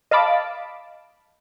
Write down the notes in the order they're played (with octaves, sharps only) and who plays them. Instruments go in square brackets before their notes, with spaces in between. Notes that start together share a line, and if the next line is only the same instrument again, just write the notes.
[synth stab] D#5 F5 A5 B5 D6